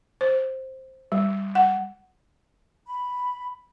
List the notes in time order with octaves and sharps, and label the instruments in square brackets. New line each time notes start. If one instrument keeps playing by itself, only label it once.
[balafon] C5
G3
F#5
[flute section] B5